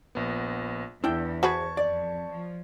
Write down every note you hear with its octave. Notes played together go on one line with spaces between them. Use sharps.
A#1 B3
E2 D4 E4 G5 E6 G6
F#4 G#4 B4 C5 A5 C#6 G#6
F2 D5
F3